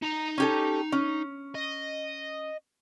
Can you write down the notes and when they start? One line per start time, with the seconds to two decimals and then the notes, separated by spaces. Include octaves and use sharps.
0.02 D#4 A#5
0.38 C#4 G4 A4
0.92 C#4
1.55 D#5